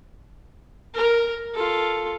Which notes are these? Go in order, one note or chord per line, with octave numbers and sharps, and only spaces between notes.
A#4
F4 A4